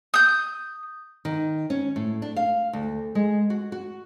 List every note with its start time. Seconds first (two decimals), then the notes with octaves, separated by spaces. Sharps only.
0.14 D#6 G6
1.25 D#3
1.70 C#4
1.96 A2
2.22 D4
2.36 F5
2.73 D2
3.15 G#3
3.50 F#4
3.72 F#4